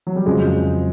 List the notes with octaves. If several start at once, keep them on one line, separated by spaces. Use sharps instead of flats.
F#3
G3
F2 C#3 F#3 G#3